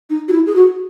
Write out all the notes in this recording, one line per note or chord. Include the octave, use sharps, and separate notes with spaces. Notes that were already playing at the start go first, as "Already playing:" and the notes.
D#4
F#4
E4
G#4
F#4